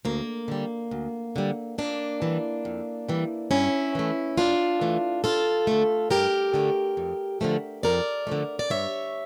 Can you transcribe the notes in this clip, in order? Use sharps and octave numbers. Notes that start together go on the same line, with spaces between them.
D2 A#3
D3 G3
D2
D3 G3
F2 A#3 D4
E3 G3
F2
E3 G3
G2 C#4 E4
E3 A3
G2 D4 F4
E3 A3
G2 F4 A4
D3 A3
G2 G4 A#4
D3 A3
F2
D3 F3 A3
F2 A#4 D5
D3 F3 A3
D5
G2 C#5 E5